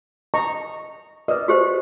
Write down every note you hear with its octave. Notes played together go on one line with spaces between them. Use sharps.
D#5 A#5 C#6
A#4 B4 D5 D#5
F#4 G4 C5